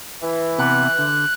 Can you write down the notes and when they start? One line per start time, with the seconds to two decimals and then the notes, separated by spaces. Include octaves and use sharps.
0.22 E3
0.58 C3 B3 F#6
0.99 D3